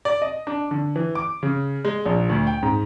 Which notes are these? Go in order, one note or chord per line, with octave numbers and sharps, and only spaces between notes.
D5
D#5
D4
D3
E3
D6
C#3
G#3
A#1
D2
G5
G#2